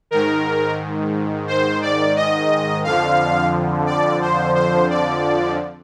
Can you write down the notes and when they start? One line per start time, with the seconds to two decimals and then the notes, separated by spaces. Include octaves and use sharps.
0.11 G#2 D#3 A#4
1.47 C5
1.82 D5
2.16 D#5
2.84 F2 D3 F3 F5
3.86 D5
4.21 C5
4.55 C5
4.90 D5